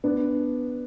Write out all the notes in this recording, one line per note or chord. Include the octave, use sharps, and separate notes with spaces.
B3 D4